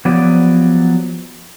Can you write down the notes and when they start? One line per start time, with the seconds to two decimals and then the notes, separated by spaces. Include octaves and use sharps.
0.05 F3 F#3 B3 G4 D5